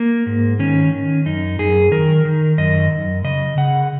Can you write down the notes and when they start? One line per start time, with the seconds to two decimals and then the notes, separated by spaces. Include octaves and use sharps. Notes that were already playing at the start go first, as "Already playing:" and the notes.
Already playing: A#3
0.26 G#2
0.59 D#3 C#4
0.93 D#3
1.25 F#2 D#4
1.59 F#2 G#4
1.91 D#3 A#4
2.25 D#3
2.58 F#2 D#5
2.91 F#2
3.24 C#3 D#5
3.57 C#3 F#5